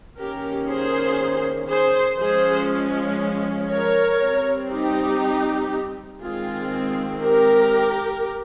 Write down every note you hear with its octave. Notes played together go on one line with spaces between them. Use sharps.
D#3 A#3 C#4 G4 A#4
G#4 C5
G#4 C5
F3 G#3 C#4 G#4 C5
A#4 C#5
G3 C4
D#4 G4
D#3 G#3 C4 F4 G#4
G4 A#4